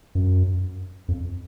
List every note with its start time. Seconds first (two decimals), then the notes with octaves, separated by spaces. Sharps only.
0.15 F#2
1.08 F2